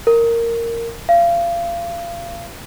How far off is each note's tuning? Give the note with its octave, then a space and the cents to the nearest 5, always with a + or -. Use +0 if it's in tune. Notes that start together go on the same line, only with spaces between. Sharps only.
A#4 -10
F5 -30